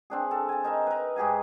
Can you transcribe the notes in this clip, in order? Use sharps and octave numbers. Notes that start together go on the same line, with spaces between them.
C4 D4 G#4
A4
G#5 A5
D#4 A#4 E5
A#4 B4
G#2 G4 G#4 G#5